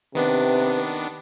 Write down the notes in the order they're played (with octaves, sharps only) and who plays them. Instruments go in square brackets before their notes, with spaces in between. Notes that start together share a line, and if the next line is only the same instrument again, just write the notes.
[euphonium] C3 [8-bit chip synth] D#3 B3 D4 [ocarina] B4